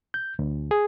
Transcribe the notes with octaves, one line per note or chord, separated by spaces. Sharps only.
G6
D2
G#4